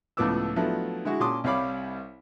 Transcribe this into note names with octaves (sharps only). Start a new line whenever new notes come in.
C#2 A2 F3 B3 D6 E6
F3 F#3 A3 B3 D4 E4
D3 G#3 E4 F#4
A#2 C#4 A5 C6 D6 D#6
C2 G3 C#5 F5 B5 D6